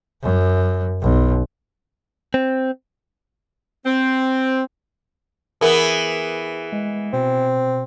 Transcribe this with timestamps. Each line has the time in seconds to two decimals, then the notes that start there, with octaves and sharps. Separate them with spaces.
0.23 F#2
1.02 B1
2.34 C4
3.86 C4
5.61 E3 B3 G#4 A#4 B5 D#6
6.73 G#3
7.13 B2 C4